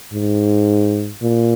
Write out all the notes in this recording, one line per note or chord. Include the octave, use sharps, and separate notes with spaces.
G#2
A#2